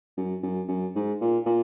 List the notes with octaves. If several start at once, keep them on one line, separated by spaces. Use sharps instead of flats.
F#2
F#2
F#2
G#2
A#2
A#2